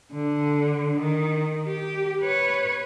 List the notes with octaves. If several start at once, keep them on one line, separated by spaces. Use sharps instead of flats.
D3
D#3
G4
B4 C#5